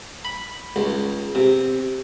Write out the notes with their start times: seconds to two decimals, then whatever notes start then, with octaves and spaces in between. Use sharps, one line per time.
0.25 B5
0.76 C#2
1.35 C3